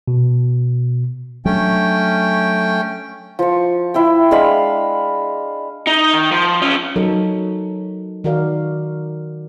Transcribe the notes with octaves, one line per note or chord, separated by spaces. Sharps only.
B2
F#3 A3 C#4 D4 G5
F3 C#6
E4 E5 G5
G#3 D4 F5 B5
D#4
D#3
F3
C#4 F4
F#3 D#4 A4 A#4 C#5
D#3 F#4 A#4 D5 F5